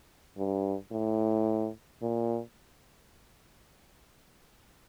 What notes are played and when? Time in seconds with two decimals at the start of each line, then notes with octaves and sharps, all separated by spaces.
0.37 G2
0.91 A2
2.02 A#2